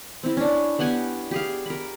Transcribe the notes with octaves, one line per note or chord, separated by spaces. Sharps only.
C4 E4
C#4 D4
B3 G4 F#5 G#5
G4 G#4 F5
A#4 B5